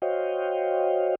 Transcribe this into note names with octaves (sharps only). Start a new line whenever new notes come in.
F#4 C5 C#5 D#5 F5 G5